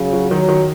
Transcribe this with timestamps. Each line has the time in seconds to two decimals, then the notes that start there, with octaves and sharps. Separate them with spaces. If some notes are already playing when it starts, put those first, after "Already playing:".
Already playing: C#3 F#3
0.13 F#3
0.31 D#3 F#3
0.48 D#3